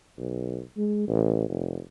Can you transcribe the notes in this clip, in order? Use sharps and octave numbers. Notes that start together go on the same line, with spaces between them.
B1
G#3
A1
F1